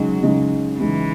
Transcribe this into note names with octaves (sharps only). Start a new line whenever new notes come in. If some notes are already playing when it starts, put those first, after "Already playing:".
Already playing: C#3 F#3 G#3 D#4
C#3 G#3 D#4
C#3 E3 G#3 D#4